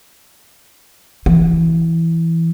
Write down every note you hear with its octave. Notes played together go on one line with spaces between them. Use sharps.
E3